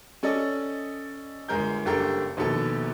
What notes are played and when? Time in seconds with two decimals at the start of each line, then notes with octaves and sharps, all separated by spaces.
0.23 C#4 A4 D5 D#5
1.49 G1 G#3 A#4 G6
1.85 F#1 G2 G4 A4 A#4 G5
2.37 A#1 D#2 B2 A4